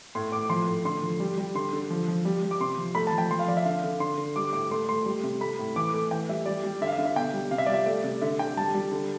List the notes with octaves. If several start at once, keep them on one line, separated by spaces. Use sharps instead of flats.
A2 C6
A2 D6
F3 C6
A2
D3 C6
F3
G3
G3
D3 C6
D3
F3
F3
G3
G3
D6
C3 C6
F3
A3 B5
A5
F3
G5
F3 C6
F5
F3 D5
E5
D3 F5
D3
D3 C6
D3
G3 D6
A2 D6
A3 C6
A3 C6
G3
C3
A3 B5
A2
E3 D6
A3
E3 G5
G3 E5
G3 D5
G3
D3 E5
F5
E5
D3
E5
B2 G5
G3
C3 F5
E5
G3 D5
E5
A3 D5
C3
D3 E5
D3 G5
G3 A5
G3
D3